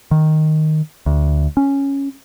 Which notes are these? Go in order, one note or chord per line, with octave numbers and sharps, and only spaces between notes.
D#3
D2
C#4